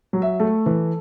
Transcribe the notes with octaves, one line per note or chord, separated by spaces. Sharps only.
F#3
E5
A3 A4
E3